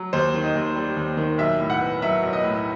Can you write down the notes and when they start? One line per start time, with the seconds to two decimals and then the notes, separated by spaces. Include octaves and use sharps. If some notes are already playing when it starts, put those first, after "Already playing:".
Already playing: F#3
0.13 D#2 C5
0.34 D#3
0.44 D#5
0.55 D#2
0.76 G3
0.97 D#2
1.17 D#3
1.38 B1 E5
1.60 A2
1.70 F#5
1.81 B3
2.02 F#3 E5
2.23 B1
2.33 D#5
2.44 A2